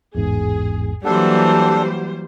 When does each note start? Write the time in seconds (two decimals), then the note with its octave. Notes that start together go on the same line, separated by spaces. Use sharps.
0.15 A1 E2 G#2 G#4
1.05 E3 F#3 G3 A#3 D4 A4 C5 F#5